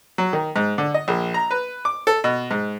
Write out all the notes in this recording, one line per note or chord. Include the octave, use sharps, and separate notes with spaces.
F#3
D#3
G#2
D3
D#5
A#1
A#5
B4
D6
A4
B2
G#2